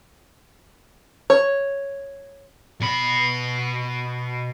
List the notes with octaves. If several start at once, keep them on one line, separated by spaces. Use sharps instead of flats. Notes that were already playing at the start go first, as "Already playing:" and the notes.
C#5
B2 B5